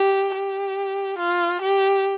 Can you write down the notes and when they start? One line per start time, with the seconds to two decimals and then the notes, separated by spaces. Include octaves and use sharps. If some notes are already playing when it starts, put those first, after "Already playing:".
Already playing: G4
0.34 G4
1.19 F4
1.62 G4